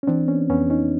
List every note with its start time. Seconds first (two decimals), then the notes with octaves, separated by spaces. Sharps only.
0.03 C#4
0.07 E3 C4 D4
0.28 B3 C#4
0.50 F2 B3 C#4
0.70 C#4 D#4